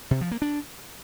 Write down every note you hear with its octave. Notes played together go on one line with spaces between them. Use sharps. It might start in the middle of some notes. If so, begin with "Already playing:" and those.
C3
F3
A#3
D4